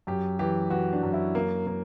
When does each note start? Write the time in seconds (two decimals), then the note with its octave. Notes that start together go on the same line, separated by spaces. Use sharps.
0.07 F#2 G4
0.39 E3 G4
0.70 E3 F#4
0.93 D4
1.03 F#2
1.13 E4
1.35 A#3
1.67 A#3